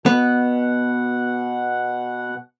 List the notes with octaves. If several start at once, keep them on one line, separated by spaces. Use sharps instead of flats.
B2 B3 F#5